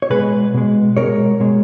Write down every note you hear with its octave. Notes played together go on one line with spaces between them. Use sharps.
C#5
B2 G#3 G#4 B4
B2 G#3
B2 G#3 A#4 C#5
B2 G#3